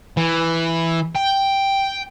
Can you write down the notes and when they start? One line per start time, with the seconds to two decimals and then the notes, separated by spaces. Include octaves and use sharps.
0.17 E3
1.16 G5